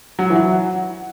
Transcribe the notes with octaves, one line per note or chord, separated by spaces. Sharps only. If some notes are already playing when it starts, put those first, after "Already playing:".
F#3
E3
F#3